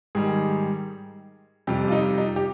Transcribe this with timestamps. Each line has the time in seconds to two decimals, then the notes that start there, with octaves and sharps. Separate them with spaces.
0.15 G#2 D#3 G3 G#4
1.67 F2 C3 G3 G4
1.88 F4
1.92 D#4
2.18 D#4
2.36 G4